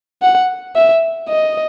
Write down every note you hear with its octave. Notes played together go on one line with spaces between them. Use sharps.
F#5
E5
D#5